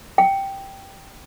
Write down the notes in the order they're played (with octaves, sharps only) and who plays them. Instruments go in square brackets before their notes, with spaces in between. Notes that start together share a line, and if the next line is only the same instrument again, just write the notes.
[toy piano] G5